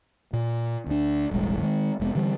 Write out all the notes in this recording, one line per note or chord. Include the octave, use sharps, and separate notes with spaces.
A#2
D2 D4
E1 A1 G3 G#3
D#3 G#3
F1 G#3 B3
D3 E3 G3